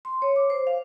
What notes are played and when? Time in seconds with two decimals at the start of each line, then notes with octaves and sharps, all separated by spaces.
0.05 C6
0.22 C#5
0.36 D6
0.50 C5
0.67 F5